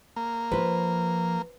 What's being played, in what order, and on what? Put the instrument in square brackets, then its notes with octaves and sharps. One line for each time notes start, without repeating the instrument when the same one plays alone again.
[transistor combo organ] A#3
[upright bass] F3 [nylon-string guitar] B4 C5